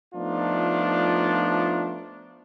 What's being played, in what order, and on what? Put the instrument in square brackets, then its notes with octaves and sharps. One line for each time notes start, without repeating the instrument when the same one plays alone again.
[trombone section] F3 A3 B3 D4 D#4 F4